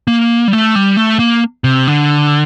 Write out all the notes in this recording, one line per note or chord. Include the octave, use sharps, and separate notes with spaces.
A#3
G3
A3
G3
A3
A#3
C3
D3